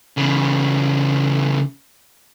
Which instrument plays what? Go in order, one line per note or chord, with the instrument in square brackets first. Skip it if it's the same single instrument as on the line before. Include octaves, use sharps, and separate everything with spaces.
[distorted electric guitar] C#3 E3